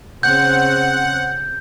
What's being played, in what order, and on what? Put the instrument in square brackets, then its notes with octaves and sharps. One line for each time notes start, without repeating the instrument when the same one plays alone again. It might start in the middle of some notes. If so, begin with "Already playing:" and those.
[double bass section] C#3 C4 [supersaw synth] F#5 [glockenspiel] G6